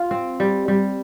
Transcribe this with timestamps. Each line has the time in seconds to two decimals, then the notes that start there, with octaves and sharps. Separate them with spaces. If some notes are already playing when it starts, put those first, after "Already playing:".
Already playing: F4
0.11 C4
0.40 G3
0.68 G3